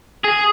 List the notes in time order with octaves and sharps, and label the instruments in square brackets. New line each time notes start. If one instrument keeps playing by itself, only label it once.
[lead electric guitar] G#4